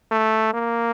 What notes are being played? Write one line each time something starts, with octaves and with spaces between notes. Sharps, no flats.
A3
A#3